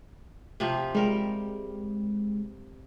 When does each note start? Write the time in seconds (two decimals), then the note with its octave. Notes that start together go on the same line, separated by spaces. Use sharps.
0.60 C3 F3 G4
0.95 G3 G#3 A#4